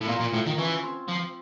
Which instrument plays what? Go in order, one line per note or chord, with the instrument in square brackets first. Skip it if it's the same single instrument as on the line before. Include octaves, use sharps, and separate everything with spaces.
[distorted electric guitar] A2
[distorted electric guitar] A#2 [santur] F4 F5
[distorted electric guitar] A#2
A2
D#3
[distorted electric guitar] E3 [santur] C#4 C#5
[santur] C4 C5
[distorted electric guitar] F3